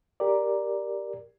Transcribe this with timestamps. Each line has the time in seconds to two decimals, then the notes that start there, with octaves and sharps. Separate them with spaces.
0.20 G4 A#4 D5